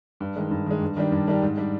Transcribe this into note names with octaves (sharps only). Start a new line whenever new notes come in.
G2
D#3 G#3
G2
D#3 G#3
G2
D#3 G3 D4 G4
G2
D#3 G3 D4 G4
G#2
G3 D4